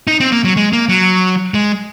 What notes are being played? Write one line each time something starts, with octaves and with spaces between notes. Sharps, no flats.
D#4
C4
A#3
F#3
G#3
A#3
F#3
G#3